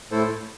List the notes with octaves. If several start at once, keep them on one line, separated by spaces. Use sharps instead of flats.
A2 A3 E4 A4 C5